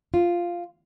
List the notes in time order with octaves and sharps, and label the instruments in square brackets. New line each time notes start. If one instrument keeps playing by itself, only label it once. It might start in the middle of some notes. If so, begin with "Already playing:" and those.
[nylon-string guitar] F4